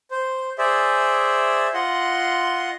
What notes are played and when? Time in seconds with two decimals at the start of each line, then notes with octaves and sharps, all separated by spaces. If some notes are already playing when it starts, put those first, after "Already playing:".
0.11 C5
0.58 G#4 C5 D5 E5
1.74 F4 D#5 F#5 C6